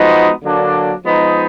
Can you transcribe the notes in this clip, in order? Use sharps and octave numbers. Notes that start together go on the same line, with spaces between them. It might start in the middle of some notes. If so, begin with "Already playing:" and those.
Already playing: F3 G#3 B3 D#4 F#4
D3 F#3 A#3 D4
F3 G#3 B3 D#4